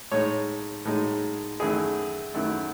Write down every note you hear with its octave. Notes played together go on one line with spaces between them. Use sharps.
A2 G#3 D#4 C#5
A2 G#3 D#4
F#2 D#3 A3 E4 G#4
F#2 D#3 A3 E4